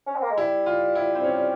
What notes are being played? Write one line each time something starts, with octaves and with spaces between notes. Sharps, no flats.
C#4
C4
A#3
G#3
G3 E4
F4
E4
C4
C#4